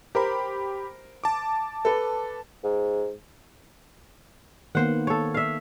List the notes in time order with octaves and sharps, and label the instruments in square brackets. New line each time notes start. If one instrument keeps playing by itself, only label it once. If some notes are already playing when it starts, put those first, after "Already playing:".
[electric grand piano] G4 B5 [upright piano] A#4 C5
[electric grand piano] A5 D6
[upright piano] A4 B4
[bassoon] G#2
[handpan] D#3 A#3 B3 [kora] C5 F#5
[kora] A4 C#5
E5 F5